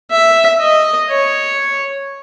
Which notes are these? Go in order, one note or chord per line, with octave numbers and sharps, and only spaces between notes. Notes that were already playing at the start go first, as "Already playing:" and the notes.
E5
D#5
C#5